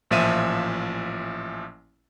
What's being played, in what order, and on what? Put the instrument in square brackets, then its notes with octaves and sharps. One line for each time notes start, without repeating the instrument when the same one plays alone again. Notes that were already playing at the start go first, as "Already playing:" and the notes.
[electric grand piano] A1 A#2 F3 E5 D#7